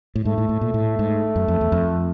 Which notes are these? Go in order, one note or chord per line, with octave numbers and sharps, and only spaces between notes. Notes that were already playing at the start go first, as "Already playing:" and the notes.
A2
G#2 A3
A2
A2
A#2
A2
G#2
F#2
F2
E2
F2